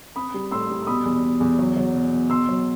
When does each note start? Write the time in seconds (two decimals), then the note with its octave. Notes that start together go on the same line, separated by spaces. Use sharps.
0.16 C4 B5 D#6
0.34 G3
0.51 A2 C6 E6
0.70 G3
0.82 E6
0.87 B2 B5 D#6
1.05 E2
1.24 B2
1.40 E2
1.59 F#3
1.77 F#3
1.94 B2
2.12 B2
2.30 B2 C6 E6
2.49 F#3